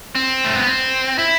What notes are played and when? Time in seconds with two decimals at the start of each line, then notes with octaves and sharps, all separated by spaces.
0.15 C4
0.45 A3
0.56 B3
0.67 C4
1.19 E4